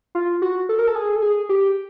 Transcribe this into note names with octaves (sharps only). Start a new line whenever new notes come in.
F4
F#4
A4
A#4
A4
G#4
A4
G#4
G4